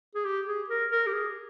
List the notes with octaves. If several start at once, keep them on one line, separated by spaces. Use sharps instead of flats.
G#4
G4
G#4
A#4
A#4
G4
G#4